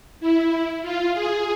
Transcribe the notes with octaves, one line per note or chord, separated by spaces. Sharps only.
E4
F4
G#4